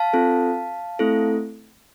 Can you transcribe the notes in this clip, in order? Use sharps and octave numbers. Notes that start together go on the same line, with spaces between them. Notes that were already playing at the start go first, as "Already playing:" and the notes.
Already playing: F5 A5
C4 F4 A4
A3 C4 E4 A4